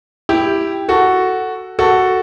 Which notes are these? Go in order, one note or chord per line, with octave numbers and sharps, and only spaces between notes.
E4 G4
F#4 A4
F#4 A4